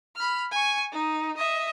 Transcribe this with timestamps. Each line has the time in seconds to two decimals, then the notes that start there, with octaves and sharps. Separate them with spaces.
0.15 B5 F6
0.51 G#5 C#6
0.92 D#4
1.37 D#5 E5